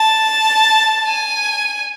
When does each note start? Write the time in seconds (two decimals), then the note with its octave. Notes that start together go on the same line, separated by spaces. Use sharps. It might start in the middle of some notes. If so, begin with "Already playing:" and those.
Already playing: A5
1.08 G#5